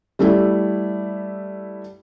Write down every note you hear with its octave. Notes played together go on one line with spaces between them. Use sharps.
G3 A3 E4